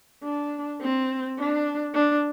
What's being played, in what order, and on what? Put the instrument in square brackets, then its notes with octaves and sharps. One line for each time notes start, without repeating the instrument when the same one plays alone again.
[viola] D4
C4
D4
D4